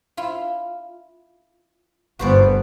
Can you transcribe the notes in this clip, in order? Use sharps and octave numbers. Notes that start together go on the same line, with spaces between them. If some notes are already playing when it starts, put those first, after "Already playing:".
E4 F4
G1 B3 F#4 C5 D5